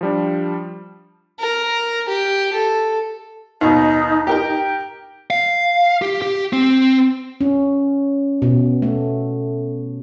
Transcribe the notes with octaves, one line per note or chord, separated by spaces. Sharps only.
F3 G3 D4
A#4
G4
A4
D#2 B2 D#4
G4 A#4 G5
F5
G4
G4
C4
C#4
B2
A3